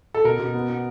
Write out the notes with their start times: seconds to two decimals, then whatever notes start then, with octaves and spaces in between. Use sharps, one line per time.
0.15 A4
0.24 B2 A#4
0.39 B2
0.54 B3
0.70 B3